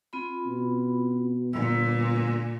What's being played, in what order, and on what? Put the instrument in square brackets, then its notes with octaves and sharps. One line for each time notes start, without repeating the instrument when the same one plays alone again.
[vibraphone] C4 F4 B5
[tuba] B2
[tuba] G1 [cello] A#2 [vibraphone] E6